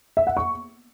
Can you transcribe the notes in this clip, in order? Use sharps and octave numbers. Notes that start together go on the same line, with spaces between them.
E5
F#5
C#6